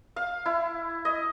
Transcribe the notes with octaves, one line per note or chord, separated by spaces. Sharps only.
F5
E4
D#5